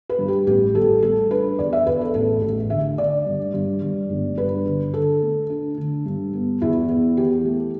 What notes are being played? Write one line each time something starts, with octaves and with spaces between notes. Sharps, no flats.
B4
G2
G4
A1 G4
G3 A4
G3 A4
D4 B4
E2 D5
E5
E2 B4
A4
A1 A4
A1
D3 E5
D3 D5
G2
G2
G2
G1
G2 B4
D3
D3 A4
A3
D4
D3
G2
B3
E2 E4
B3
E3 G4
A3